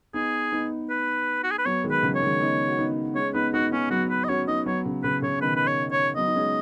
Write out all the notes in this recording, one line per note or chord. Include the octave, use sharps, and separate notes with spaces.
B3 D#4 G#4
B3 D#4
B4
F#4
G#4
B4
F#3 B3 C#5
D#3 G#3
B4
C#3 F#3
C#5
D#3 G#3
B3 D#4
F#4
B3 D#4
G#3 C#4 C#5
B3 D#4 B4
B3 D#4 F#4
B3 C#4 D#4
F#3 B3 F#4
B4
D#5
C#4 F#4 C#5
B3 D#4 D#5
F#3 B3 C#5
C#3
C#3 B4
C#3 C#5
B2 D#3 B4
B4
C#5
C#5
F#3 B3 D#5
D#4
G#3 C#4